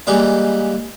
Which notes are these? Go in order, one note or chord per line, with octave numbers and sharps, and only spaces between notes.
E3 G3 G#3 A#3 D#4